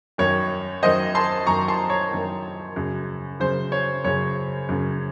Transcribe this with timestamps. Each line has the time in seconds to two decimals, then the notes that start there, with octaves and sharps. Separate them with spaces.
0.18 F#2 D#3 C#5
0.83 F#2 D#3 C5 D#5
1.15 A5 C6
1.47 F#2 D#3 A#5 C#6
1.68 A5 C6
1.90 C#5
2.12 F#2 D#3
2.76 F#2 C#3
3.40 F#2 C#3 C5
3.72 C#5
4.04 F#2 C#3 C#5
4.69 F#2 C#3